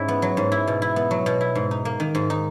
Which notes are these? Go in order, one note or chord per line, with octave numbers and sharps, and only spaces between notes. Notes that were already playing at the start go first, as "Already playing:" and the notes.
Already playing: G#2 G#3 C#4 E4
B3
F#3
G#2
E4
B2
E4
B3
F#3
B2
E4
G#2
D#4
A#3
D#3
G#2
D#4